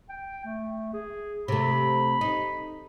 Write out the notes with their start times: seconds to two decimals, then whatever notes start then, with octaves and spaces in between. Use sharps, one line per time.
0.09 G5
0.45 A3
0.94 G#4
1.48 C3 A3 B5
2.21 D#4